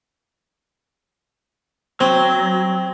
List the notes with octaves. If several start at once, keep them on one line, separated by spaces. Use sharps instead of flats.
F#3 C4